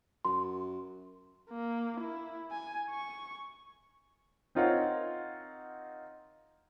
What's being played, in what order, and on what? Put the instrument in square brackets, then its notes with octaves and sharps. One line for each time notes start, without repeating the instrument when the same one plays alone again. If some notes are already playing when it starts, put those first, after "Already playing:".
[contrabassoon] F#2 [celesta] C6
[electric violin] A#3
E4
G#5
C#6
[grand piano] C4 D#4 F4 A#4 C#5 F#5